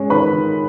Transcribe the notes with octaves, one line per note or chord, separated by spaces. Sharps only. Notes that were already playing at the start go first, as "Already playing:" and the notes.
Already playing: G#3 C#4
D#3 B4 B5
D#3